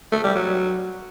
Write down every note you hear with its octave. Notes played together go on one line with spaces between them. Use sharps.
A3
G3
F#3